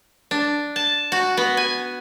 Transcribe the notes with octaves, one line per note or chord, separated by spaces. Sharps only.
D4
A5
F#4
B3
G#5